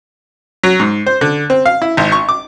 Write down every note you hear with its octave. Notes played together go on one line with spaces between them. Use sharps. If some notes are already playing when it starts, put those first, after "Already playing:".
F#3
G#2
C5
D3
C4
F5
E4
G#1
C#6
D6